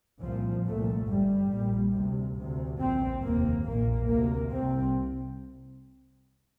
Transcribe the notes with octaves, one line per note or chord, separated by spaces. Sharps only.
C2 A#2 F3
C2 A#2 A3
G1 G2 G3
A#1 A#2
D2 C3
D2 C3
A#1 A#2 C4
F1 D#2 A#3
A#1 A#2 A#3
D2 C3 A#3
C2 C3 C4